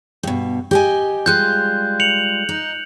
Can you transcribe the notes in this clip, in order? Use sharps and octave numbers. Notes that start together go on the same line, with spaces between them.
G2 B2
G4 D#5 G#5
G3 G#3 F4 F#6 G6
C#7 F7 F#7
D#4